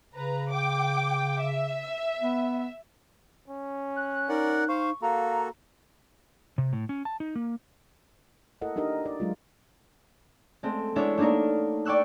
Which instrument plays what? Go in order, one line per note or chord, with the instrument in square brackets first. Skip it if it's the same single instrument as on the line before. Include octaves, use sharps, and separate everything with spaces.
[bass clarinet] C#3 [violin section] B4 A#5
[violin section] G5 D6
E5
[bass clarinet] B3
[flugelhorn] C#4
[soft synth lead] F#6
[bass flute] D#4 [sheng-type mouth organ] A#4 D5 F#5
[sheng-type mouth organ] C5 F5 [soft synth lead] C#6
[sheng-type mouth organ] A#3 F#4 A4 [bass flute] F5 [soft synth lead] A#5
[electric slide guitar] C3
A2
C#4
A5
D#4
A#3
[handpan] E4 A4 A#4 D#5 F#5
D4 D#4 G4 A#4 D#5
D5
F#3 G#3 F4
[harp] G#3 A3 C4
G#3 B3 D4 E4 C#5 E5
A3 A#3 D4 D#4 A#4
D5 G5 C#6 E6 F#6